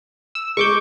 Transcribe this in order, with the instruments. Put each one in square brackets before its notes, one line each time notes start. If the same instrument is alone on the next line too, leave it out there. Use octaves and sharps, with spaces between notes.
[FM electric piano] E6
[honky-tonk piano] G#3 [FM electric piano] C#6 D6 G6